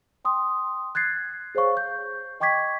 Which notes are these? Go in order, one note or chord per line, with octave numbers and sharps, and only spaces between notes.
G5 C6 D#6
F#6 G#6 A6 C7
G#4 C5 C#5 F5 C#6
G6
D#5 G5 C#6 D6 G#6 B6